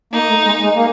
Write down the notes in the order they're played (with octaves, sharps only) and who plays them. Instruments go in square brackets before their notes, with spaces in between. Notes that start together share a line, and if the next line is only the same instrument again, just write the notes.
[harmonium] A#3 [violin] D#4
[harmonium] A3
G#3
G#3
A#3